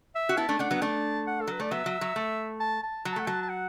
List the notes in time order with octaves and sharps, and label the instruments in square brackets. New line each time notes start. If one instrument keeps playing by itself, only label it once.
[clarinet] E5
[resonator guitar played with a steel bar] F#4
[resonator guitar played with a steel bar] B3 E4 [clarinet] A5
[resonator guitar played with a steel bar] A3 D4
[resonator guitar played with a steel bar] A3 D4 [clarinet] F#5
[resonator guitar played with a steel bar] F#3 B3
[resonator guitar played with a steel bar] A3 D4 [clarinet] A5
[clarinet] F#5
A4
[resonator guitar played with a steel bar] F#3 [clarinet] B4
[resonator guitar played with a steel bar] A3 [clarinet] D5
[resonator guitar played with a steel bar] F#3 B3 [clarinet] E5
[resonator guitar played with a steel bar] F#3
F#3
A3
[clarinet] A5
A5
[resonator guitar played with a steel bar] F#3
[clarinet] A5
[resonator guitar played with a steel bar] A3 [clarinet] F#5
[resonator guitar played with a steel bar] F#3 [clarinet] A5
[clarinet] A5
F#5